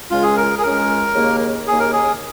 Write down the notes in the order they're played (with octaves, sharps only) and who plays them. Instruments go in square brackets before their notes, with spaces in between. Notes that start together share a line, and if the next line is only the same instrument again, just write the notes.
[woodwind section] C#2 C#3 G#3 C#4 [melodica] F4
[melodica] G#4
A#4
G#4
[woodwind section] C#2 C#3 G#3 C#4 [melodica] A#4
[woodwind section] D#2 C#3 A#3
[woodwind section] D#2 C#3 A#3 [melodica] G#4
[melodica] A#4
G#4